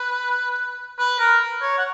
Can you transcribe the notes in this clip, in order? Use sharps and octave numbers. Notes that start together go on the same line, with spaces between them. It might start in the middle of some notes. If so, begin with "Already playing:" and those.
Already playing: B4
B4
A#4
C#5
F#5